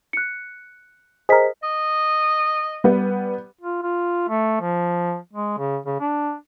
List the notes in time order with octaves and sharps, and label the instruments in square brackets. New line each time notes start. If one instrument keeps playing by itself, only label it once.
[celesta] F#6 C#7
[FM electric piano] G#4 A#4 [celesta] C5 D#5 B6
[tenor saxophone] D#5
[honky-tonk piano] G3 B3
[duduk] F4
F4
A3
F3
G#3
C#3
C#3
D4